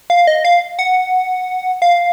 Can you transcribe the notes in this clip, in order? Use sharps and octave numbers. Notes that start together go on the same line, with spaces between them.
F5
D#5
F5
F#5
F5